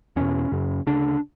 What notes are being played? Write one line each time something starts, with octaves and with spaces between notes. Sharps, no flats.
E2 B2 C#4
F#2 C#3
D2 C#3 D4